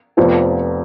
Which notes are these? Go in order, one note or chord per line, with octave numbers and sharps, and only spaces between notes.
F1 F2 F3 B3